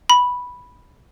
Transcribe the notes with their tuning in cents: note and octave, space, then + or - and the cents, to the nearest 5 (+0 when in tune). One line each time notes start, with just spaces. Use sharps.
B5 -5